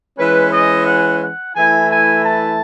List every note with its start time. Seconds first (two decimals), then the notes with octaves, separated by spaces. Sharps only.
0.17 E3 G#3 C#4 B4
0.51 D#5
0.86 F#5
1.21 F#5
1.55 E3 A3 E4 G#5
1.91 G#5
2.24 A5